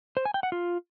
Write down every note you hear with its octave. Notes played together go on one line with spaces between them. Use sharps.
C5
G#5
G5
F#5
F4